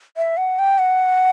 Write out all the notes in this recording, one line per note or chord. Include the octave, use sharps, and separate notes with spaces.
E5
F#5
G5
F#5